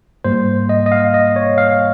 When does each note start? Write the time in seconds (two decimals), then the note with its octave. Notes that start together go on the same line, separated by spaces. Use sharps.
0.24 G#2 G3 A#3 C5
0.69 D#5
0.86 D#5
0.92 F5
1.14 D#5
1.36 C#5
1.58 F5